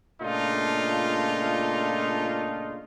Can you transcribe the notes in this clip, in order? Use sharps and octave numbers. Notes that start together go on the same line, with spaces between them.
A#2 C#3 A3 D4 D#4 F4